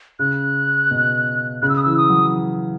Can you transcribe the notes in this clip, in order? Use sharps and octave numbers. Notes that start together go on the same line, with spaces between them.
C#3 F#6
B2
C#3 F#6
E6
D#6
E3 E6
D#6
F#3